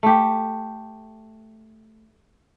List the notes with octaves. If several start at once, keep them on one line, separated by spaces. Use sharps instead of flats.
A3 G4